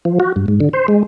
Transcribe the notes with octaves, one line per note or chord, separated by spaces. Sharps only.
F3
F#4
G2
G#2
D3
C5
G#3